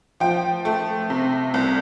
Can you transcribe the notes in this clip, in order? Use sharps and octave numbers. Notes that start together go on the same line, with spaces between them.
F3 G5
A3
C3
C2